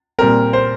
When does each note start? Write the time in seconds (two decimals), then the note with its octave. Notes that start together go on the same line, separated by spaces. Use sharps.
0.19 A#2 G3 C4 A#4
0.53 C5